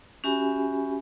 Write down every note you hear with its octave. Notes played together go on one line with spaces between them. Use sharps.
C#4 F#4 G4 E5 G#5 B5